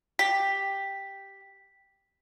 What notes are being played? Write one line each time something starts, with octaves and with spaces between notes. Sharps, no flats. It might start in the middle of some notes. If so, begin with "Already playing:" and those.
G4 B6